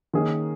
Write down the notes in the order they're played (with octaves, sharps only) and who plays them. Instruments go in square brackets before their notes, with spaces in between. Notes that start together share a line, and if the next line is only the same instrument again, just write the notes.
[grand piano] D#3 A#3 C#4 G#4